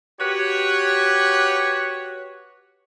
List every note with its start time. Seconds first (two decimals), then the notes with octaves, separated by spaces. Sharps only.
0.20 F#4 G4 B4 C#5